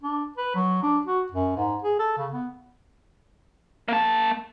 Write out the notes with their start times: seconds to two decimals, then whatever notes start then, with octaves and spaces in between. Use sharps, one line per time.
0.02 D4
0.37 B4
0.55 F#3
0.83 D4
1.06 F#4
1.32 F#2
1.56 G#2
1.83 G#4
1.99 A4
2.17 C#3
2.32 B3
3.88 A#3 A5